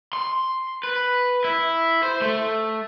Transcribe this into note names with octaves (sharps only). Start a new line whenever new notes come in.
C6
B4
E4
C5
A3